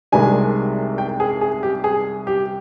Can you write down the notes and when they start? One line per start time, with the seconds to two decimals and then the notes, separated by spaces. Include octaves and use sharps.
0.12 C2 C3 D#3 G#3 D4 G#5
0.98 G5
1.20 G#4
1.41 G#4
1.63 G4
1.84 G#4
2.27 G4